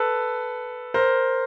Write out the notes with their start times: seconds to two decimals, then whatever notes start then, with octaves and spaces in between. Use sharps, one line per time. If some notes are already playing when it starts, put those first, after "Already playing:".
Already playing: A4 B4
0.94 A#4 C5